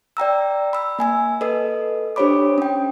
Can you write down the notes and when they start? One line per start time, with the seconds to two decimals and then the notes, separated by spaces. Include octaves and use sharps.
0.17 D5 G5 A#5 E6
0.73 B5 E6
0.99 A#3 G#5 E6
1.41 A4 B4 D#5
2.16 D4 G4 C5 C#5 B5 D6
2.58 C#4 G5